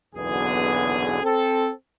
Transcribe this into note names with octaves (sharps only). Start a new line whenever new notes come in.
F#1 B1 E2 D3 B3 G#4
C4 A4